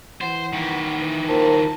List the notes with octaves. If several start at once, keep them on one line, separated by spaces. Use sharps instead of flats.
E3 C5 F#5
D#3 E4
E3
D#2 F4 A#4 C5 A5